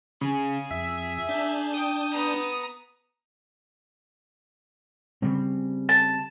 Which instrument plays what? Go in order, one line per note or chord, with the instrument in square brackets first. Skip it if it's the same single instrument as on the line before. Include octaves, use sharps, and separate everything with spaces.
[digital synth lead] C#3 [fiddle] G#4
[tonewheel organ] F2 [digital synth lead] E5
[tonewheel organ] D4 A5 G6
[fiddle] G5 [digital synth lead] D#6
[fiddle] B3 A#5
[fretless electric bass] C#3 G3 C4
[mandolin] A5